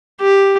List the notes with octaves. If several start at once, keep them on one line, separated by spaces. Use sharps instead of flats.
G4